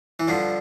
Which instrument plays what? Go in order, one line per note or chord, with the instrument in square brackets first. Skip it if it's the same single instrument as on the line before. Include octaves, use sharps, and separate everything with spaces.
[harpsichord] E3
G2 D3 F3